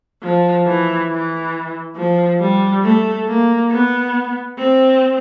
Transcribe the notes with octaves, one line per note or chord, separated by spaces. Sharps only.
F3
E3
E3
F3
G3
A3
A#3
B3
C4